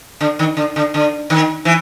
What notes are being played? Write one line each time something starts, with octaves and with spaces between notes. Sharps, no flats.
D3
D#3
D3
D3
D3
D#3
E3